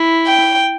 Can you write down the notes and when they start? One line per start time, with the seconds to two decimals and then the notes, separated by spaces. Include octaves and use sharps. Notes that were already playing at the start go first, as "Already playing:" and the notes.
Already playing: E4
0.27 G5